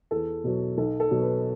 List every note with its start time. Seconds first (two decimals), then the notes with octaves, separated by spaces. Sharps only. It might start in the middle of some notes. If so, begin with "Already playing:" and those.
0.11 E2 A4
0.44 B2 F#3
0.78 B1 A4
1.00 A4
1.11 B2 F#3
1.22 B4